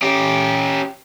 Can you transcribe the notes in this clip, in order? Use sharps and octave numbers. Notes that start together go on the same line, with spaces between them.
C#4 G4